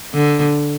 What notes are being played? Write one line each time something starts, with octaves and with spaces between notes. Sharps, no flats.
D3